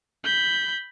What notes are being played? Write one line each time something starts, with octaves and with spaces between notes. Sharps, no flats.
B5 G6